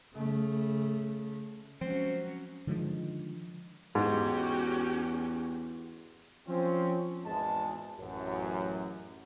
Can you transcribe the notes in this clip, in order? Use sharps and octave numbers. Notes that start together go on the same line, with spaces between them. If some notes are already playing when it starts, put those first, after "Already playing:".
C#3 A3
F3 F#3 G#3 C4 C#4
D3 D#3 F3 G#3
E2 G#2 C#4 F#4 G4
F3 C4 C#4
G#1 E2 G#3 A5
A1 F#2